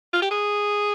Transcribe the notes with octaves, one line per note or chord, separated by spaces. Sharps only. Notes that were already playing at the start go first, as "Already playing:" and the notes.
F4
G4
G#4